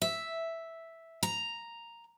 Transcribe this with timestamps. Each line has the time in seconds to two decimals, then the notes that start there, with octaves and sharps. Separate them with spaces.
0.02 E5
1.23 A#5